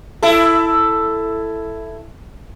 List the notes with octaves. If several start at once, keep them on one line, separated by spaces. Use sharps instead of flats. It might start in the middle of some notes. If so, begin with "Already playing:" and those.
E4 A4